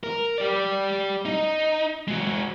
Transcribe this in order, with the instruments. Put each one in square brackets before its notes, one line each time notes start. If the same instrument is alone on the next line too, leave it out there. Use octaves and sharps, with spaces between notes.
[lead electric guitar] A#4
G4 D5
D#4
G#3 F#4